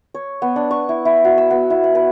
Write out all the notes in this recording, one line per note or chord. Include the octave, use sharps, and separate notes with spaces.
C#5
B3
D4
C#6
E4
E4
F#4
E6
B3
E4
F#5
B4